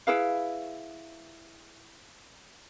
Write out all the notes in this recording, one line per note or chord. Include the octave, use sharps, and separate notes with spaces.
E4 G#4 B4 F5